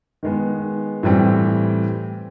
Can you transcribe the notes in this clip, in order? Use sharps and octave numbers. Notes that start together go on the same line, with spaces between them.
D#3 G#3 B3
A2 E3 G3 C4